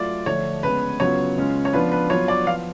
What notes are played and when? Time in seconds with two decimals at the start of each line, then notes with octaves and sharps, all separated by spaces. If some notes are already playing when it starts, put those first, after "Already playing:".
Already playing: F#3 A3 F4 D5
0.26 D3 F3 A3 D4 C#5
0.63 C#3 G#3 B3 B4
1.00 C#3 F#3 B3 F4 C#5
1.37 C#3 G#3 C#4 F4
1.65 C#5
1.73 F3 B3 D4 F4 B4
1.91 B4
2.10 F#3 B3 F4 C#5
2.28 D5
2.47 F3 B3 F4 F5